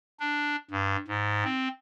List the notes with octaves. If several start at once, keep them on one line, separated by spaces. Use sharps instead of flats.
D4
G2
G#2
C4